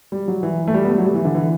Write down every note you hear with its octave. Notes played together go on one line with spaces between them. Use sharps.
G3
F#3
E3
A3
G3
B3
A3
F#3
G3
E3
D3
E3